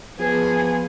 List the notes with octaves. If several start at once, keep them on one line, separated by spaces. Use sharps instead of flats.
F3 B3 G#4